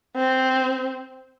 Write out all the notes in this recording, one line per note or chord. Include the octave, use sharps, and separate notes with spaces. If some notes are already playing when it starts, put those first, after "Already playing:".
C4